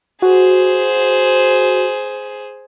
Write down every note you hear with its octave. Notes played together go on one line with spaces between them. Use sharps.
F#4 G#4 C5